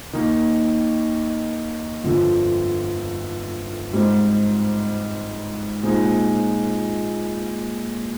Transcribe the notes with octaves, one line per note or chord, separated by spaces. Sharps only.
D#2 D#3 A#3 D#4
G1 F2 D3 F3 C4
G#2 G3 C4
A#2 G#3 C4 D#4